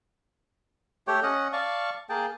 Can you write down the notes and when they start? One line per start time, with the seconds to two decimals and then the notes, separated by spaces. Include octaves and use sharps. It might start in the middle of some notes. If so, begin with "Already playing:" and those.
1.07 A3 G4 C#5 G5
1.23 C#4 D#5 F#5
1.53 D5 F5 A5 C#6
2.09 A#3 G#4 G5 A5